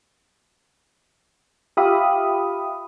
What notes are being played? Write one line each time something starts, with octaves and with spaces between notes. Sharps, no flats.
F4 G4 E5 F5 B5 D#6